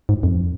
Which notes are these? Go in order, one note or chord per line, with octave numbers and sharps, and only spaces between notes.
G#2
F2